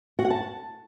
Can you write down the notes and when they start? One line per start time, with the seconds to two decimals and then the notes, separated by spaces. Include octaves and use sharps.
0.19 F#4
0.25 F#5
0.30 A5